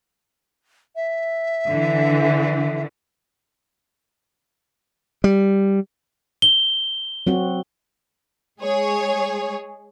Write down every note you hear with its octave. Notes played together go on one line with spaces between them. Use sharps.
E5
D3 E3
G3
G7
F#3 C4 F#4
G#3 G#4 C#5